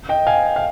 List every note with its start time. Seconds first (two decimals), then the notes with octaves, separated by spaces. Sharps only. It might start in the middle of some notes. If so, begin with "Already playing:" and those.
0.09 D#5 G5
0.27 F5 G#5
0.56 F5